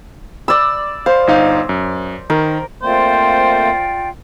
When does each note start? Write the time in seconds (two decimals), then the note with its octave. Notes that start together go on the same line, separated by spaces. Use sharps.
0.48 D5 E6
1.06 C5 F5
1.27 G1 D#4 F5
1.69 F#2
2.30 D#3 A#4
2.82 A3 A#3 C4 F4 C5 D5 G5